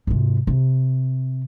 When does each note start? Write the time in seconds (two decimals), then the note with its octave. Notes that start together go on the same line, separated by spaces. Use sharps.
0.07 G#2 C3
0.47 C3